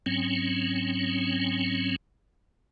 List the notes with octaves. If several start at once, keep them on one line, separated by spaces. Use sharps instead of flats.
G#2 F#3 C4 C#4